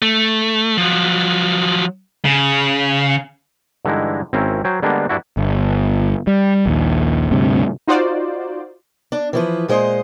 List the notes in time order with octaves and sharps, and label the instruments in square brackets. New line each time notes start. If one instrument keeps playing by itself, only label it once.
[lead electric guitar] A3
F3 F#3
[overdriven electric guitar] C#3
[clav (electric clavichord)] G2 D3 E3 G#3 D#4 E4
G#1 C4 C#4 E4 A#4
F#3 C5 G5 G#5
D3 G3 G#3 A#3 B3 D4
G2 D4 E4 F#4
[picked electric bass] G1
G3
A#1 D#2
D2 G2 C3
[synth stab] D#4 F4 F#4 C5 D5
[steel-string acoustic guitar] D4
E3 F3 B4
A#2 G#3 C5 D#5